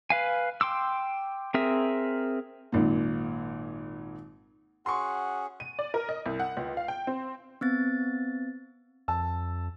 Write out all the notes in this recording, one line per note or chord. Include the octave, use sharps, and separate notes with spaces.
B4 F5 G#5
G5 C6 D6 E6
C4 G#4 A#4 E5
G#1 A#2
C#4 F#4 G#4 F#5 C6 C#6
D#7
D5
A#4
D#5
C2
F#5
C#2
F5
G5
C4
B3 C4 A6
F2 A5 E6